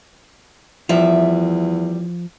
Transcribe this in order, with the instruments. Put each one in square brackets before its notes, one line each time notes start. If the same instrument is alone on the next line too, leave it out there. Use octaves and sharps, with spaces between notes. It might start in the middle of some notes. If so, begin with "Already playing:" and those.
[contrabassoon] E2 [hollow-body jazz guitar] F3 [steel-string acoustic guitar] G3 E5